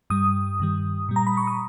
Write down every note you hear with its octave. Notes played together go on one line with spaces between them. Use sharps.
G2 G3 D#6
G2 D#3 G3
A#2 G3
A#5
B5
C#6
D#6